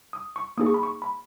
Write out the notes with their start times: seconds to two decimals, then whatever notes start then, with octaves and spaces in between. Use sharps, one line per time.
0.13 D#6
0.36 C#6
0.58 A#3 D#4 G#4 D#6
0.66 C#6
0.74 B5
0.83 C#6
1.02 B5